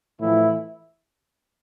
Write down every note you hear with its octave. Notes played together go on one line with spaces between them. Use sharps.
A2 E3 F3 A3 E4